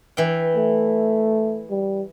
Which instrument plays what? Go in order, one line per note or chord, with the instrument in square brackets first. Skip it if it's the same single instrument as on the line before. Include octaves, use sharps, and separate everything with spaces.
[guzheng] E3 G5
[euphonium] A3
G3